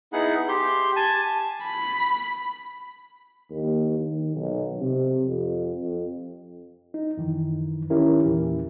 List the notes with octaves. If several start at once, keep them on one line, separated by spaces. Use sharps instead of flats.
B3 D#4 E4 G#4 F#5
G4 C6
G#5 A5
B5
D#2
D#3
B1
C3
F2
F2
D#4
F#2 D#3 E3
D#3 C#4 E4 G4 A#4
E2 A#2 E3